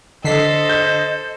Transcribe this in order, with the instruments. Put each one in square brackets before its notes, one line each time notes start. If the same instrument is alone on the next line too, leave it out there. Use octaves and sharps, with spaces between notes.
[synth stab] D3 B6 C7 [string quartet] A4 C5 [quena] D#5
[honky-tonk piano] G6